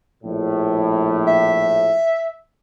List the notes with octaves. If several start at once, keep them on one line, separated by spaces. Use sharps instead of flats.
A#1 A2
E5